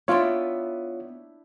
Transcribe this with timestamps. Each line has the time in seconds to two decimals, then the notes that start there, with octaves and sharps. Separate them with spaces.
0.08 B3 D4 E4 F4 C#5 D5 G5